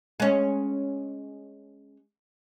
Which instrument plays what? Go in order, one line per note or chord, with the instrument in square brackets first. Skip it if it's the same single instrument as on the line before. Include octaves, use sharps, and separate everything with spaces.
[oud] G#3 C#4